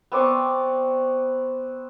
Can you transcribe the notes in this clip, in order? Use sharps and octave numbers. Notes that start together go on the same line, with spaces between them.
B3 C4 D5 C#6